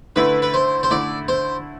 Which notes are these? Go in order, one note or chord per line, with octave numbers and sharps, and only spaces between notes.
D3 A3 E4 B4
B4
C5
C5
D3 A3 E4 D5
C5